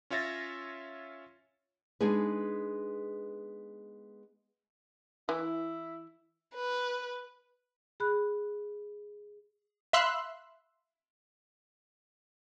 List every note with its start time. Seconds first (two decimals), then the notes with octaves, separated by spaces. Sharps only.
0.10 C#4 F4 C#5 E5 A6 A#6
2.00 G#3 B3 D4 D#4 G#4 B4
5.29 E3 E4
6.55 B4
8.00 G#4 B5 F#6
9.93 E5 F5 B5 C6 E6 F#6